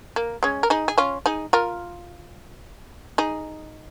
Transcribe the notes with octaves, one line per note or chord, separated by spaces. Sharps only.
A#3
G#3 C#4
A#4
D#4 G#4
G#4
C#4 F4
D#4 G#4
F4 A#4
D#4 G#4